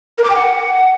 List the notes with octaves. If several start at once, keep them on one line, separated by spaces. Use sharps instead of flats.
A#4
D6
G5
F#5